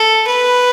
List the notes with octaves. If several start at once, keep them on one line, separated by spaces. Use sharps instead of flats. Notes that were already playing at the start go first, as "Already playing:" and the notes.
Already playing: A4
B4